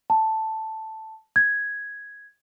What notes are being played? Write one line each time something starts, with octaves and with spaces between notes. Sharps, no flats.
A5
G#6